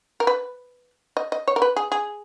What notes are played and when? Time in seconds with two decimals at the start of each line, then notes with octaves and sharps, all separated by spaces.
0.20 A#4
0.27 B4
1.17 D#5
1.32 D#5
1.48 C#5
1.56 A#4
1.62 B4
1.76 G#4
1.92 G#4